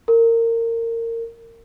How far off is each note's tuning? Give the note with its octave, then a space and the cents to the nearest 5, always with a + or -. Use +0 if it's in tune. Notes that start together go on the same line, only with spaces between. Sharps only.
A#4 -25